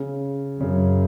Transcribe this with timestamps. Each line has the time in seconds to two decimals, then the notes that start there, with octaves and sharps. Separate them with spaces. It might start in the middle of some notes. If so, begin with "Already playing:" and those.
Already playing: C#3
0.60 F#2 C#3